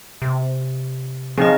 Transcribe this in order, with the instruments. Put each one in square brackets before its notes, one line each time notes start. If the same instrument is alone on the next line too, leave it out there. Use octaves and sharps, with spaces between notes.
[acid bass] C3
[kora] C#3 [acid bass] F3 [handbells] C4 D#4 D#5